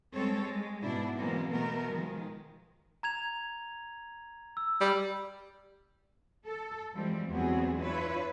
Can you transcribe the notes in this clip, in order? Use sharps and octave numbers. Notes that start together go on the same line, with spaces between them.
G3 G#3 C4 A4 C#5
G#3
G#2 B2 D4 E4
B2 E3 F#3 G#3 A#3 C4
B2 A3 B3 A#4
D#3 F3 G#3
A#5 G#6 F7
E6
G3
A4
E3 F3 G3 G#3 C4
E2 F#3 B3 C4 F#4 G#4
D4 E4 F4 B4 C#5